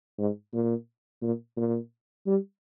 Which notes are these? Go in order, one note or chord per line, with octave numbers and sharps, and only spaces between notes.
G#2
A#2
A#2
A#2
G3